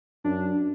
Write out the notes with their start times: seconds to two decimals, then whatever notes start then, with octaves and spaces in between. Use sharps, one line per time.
0.24 F#2 D4